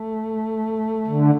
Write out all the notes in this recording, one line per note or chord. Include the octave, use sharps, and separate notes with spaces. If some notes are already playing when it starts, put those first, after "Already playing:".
Already playing: A3
D3